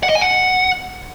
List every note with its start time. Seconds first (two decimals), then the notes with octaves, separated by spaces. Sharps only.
0.03 F#5
0.09 D#5
0.15 G#5
0.21 F#5